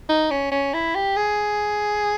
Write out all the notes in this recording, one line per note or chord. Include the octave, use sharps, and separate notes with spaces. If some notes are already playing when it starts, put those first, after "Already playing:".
D#4
C#4
C#4
E4
G4
G#4